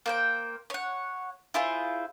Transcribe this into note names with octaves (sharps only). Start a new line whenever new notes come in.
A#3 C5 G5
C#5 F#5
E4 F4 G#4 C5